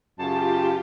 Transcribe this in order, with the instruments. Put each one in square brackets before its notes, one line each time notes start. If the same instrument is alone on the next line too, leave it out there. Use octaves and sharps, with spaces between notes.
[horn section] F#2 C#3 A5 [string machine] F4 G4